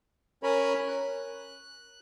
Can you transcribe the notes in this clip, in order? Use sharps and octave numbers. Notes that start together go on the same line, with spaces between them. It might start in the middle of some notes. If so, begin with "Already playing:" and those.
C#4 A#4 C#5 G#5 B5
F#6